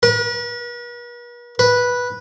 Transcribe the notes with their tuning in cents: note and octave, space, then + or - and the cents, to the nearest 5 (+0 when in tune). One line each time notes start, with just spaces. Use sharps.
B4 -45
B4 -10